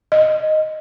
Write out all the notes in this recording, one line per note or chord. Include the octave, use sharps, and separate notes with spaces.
D#5